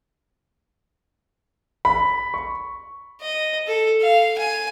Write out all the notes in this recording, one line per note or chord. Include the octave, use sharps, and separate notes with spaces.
B5
C#6
D#5
A4
F5
G#5